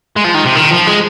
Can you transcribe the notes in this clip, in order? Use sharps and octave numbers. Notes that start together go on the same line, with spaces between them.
G#3
F3
D#3
C3
D#3
F3
G#3